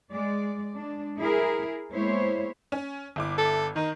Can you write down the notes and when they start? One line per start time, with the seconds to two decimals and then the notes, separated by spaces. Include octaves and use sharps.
0.10 G#3 D5
0.75 G#3 D4
1.18 E4 G#4 A#4
1.93 G#3 A#3 B3 E4 C5 C#5
2.72 C#4
3.16 G1 E4 D6
3.38 A4
3.76 D#3 D#4